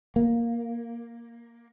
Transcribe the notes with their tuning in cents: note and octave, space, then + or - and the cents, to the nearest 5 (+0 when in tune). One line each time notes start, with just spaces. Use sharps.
A#3 +5